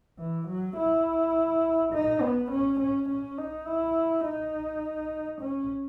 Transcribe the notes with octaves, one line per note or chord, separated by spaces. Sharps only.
E3
F#3
E4
D#4
B3
C#4
C#4
C#4
D#4
E4
D#4
C#4